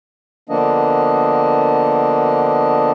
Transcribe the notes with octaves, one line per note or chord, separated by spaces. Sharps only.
D3 F3 A#3 B3 D4 D#5